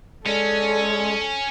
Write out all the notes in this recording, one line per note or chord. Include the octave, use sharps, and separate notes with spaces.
G#3 C#4 A4 D5